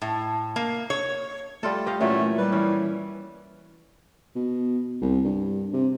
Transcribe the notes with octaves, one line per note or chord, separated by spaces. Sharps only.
A2
A#3
C#5
G3 A3 F4 A4
G4 D#5 F5
A#2 E3 F#3 A3 C#4
G3 B4
E3 C#4
B2
C2
G2
C3